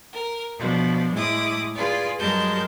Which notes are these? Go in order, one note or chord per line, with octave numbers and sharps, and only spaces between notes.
A#4
B2 F3 D4
A2 G#3 E4 D6 D#6
F4 G#4 B4 D5
G2 F#3 G#3 A#4 A5 G6